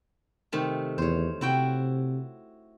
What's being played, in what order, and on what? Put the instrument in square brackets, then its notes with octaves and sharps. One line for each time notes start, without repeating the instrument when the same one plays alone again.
[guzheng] C3 D#3 A3
[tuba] E2 [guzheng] C5 C#5
[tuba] C3 [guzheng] E4 F#4 G5